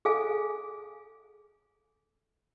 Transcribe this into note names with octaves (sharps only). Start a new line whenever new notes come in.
G#4 A4 F5 G#5